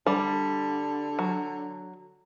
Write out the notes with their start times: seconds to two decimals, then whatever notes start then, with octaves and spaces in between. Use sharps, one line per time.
0.07 D3 G3
1.19 F#3